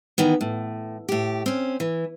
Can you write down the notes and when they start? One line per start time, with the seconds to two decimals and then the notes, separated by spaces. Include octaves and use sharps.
0.18 D#3 E3 B3
0.41 A2
1.09 A2 G4
1.46 C4 C#4
1.80 E3